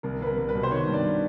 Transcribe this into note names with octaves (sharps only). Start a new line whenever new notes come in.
C2 A#4
C2 B4
A#4
C2
B4
B2
C5
D#3 C#5
G2
D5